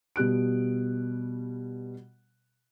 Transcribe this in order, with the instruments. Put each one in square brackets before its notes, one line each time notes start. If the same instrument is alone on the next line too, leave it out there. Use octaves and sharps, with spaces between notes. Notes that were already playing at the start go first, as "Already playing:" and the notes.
[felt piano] B2 G3 F#6 D7